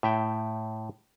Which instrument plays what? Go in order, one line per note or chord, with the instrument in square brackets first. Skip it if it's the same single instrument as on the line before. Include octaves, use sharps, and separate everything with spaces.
[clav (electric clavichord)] A2 E5 G5